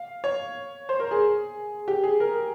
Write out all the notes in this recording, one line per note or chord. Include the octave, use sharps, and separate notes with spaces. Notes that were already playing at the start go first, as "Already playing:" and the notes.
Already playing: F5
C#5
C5
A#4
G#4
G4
G#4
A#4